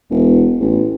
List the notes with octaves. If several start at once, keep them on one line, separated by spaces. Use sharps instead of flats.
E1
A1